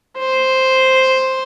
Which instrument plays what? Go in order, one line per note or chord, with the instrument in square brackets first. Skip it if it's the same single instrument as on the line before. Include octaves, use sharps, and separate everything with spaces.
[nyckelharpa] C5